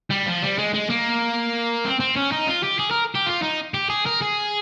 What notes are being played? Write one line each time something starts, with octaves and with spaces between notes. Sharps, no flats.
G3
F3
G3
G#3
G#3
A#3
C4
C4
C#4
D#4
F4
G4
G#4
A#4
G4
F4
D#4
G4
G#4
A#4
G#4